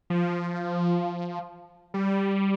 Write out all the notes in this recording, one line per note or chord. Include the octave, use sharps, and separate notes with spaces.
F3
G3